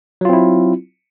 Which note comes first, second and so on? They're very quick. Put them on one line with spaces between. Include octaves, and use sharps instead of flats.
F#3 F4 C4 E4